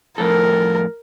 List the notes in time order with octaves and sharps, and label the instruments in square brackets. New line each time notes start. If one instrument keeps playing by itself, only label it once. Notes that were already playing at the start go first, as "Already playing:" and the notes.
[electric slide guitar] F2 A2 A4 [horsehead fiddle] A#4